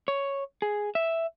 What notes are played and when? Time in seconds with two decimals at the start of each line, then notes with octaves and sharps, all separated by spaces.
0.08 C#5
0.62 G#4
0.95 E5